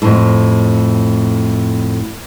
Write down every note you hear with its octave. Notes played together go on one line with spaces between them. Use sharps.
F2 A2